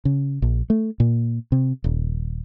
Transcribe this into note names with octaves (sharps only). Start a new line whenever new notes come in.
C#3
A#1
A3
A#2
C3
D#1